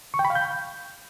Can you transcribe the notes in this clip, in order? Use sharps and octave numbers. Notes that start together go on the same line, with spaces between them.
C#6
G5
B5
F5
G6